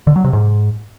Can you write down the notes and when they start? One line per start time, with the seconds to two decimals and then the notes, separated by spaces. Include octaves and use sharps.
0.07 D3
0.16 F#3
0.24 C3
0.33 G#2